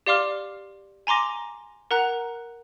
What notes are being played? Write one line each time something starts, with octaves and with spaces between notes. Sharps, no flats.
G4 D5 F5 C6 D6 F6
G#5 A#5 C6 D6 A#6
A#4 F#5 A#5 F#6 F7